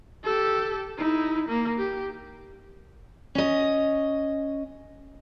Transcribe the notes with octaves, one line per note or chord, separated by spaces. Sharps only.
G4 A4
D#4 E4
A#3
G4
C#4 D#5